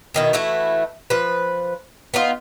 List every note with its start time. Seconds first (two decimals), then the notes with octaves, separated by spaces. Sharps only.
0.14 B2 D#3 E4
0.33 E3 A3 E4 F#4
1.10 F3 B4
2.14 B3 D#4 F4